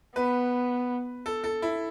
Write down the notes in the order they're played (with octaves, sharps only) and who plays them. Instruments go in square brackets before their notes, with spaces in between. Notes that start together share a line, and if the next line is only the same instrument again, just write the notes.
[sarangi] B3 [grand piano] B4
[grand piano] A4
A4
E4